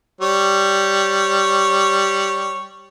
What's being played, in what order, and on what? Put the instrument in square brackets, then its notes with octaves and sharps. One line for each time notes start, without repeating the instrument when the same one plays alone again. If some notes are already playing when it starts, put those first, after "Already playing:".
[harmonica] G3 C#5